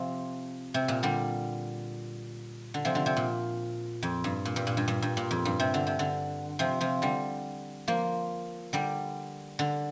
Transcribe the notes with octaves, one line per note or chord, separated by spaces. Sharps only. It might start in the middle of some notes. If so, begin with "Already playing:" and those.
Already playing: C3 F3
C3
A#2
D3 G3
D3
C3 F3
D3
C3
A#2
F2
G2
A#2
G2
A#2
G2
G2
G2
A#2
F2
G2
C3
D3
C3
D3
C3 F3
C3 F3
D3 G3
F3 A#3
D3 G3
D3